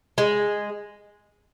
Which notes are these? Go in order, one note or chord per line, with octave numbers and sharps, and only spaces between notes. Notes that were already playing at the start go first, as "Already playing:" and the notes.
G#3